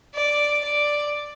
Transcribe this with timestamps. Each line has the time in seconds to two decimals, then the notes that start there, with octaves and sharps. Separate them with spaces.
0.15 D5
0.64 D5